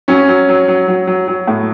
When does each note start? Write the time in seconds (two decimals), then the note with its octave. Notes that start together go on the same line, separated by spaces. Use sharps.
0.08 F#3 C#4
0.28 F#3
0.49 F#3
0.68 F#3
0.88 F#3
1.07 F#3
1.28 F#3
1.47 A2